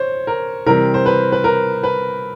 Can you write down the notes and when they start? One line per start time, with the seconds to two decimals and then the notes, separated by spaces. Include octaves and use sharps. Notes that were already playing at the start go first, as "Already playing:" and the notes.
Already playing: C5 C#5
0.27 A#4
0.66 C3 E3 G3 C4 A#4
0.94 C5
1.06 B4
1.32 B4
1.44 A#4
1.83 B4